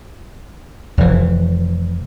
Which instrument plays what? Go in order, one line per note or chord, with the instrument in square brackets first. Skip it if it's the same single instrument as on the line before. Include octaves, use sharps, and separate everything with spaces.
[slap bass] F1 E3